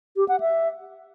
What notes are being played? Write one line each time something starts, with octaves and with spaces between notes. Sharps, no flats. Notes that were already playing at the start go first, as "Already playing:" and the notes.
G4
F#5
E5